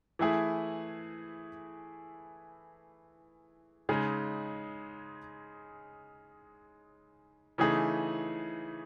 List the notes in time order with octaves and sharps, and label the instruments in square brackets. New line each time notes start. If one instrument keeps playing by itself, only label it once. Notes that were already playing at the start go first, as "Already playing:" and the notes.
[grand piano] E3 A3 E4 G#4
C#3 G#3 D#4 G#4
C#3 E3 A3 D#4 G#4